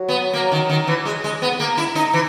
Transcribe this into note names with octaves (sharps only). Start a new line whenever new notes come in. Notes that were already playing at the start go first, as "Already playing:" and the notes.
Already playing: F#3
B3
A#3
D#3
D#3
E3
G#3
G#3
B3
A#3
E4
D#4
E3